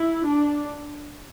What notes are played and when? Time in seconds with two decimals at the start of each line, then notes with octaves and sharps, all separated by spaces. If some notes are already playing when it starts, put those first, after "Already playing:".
Already playing: E4
0.26 D4